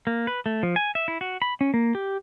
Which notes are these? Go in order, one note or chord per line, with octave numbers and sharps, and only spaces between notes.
A#3
B4
A3
F3
G#5
E5
E4
F#4
B5
C#4
A#3
G4